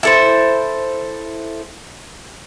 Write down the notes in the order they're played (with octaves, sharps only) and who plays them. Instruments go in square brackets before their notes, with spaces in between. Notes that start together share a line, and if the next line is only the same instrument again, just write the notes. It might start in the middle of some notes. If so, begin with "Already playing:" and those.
[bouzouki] E4 A4 C5